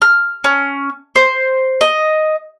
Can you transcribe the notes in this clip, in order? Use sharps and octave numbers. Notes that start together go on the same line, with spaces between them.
F6
C#4
C5
D#5